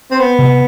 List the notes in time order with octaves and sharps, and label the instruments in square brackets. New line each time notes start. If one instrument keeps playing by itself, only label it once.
[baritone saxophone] C4
B3
[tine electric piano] C3